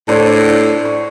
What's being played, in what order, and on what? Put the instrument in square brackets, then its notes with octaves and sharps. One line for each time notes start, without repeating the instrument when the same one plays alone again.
[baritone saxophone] A2 [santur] D4 C5 C#5
[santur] C#6